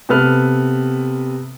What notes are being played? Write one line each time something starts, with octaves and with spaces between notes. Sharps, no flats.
C3 B3 A4 B4 F6